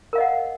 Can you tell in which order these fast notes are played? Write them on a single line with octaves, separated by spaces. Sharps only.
A#4 F5 D#5 F#5